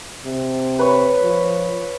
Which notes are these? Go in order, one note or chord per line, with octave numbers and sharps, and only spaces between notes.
C3
B4 C#5
F3